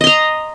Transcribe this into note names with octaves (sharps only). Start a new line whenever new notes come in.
D#5 A#5 C6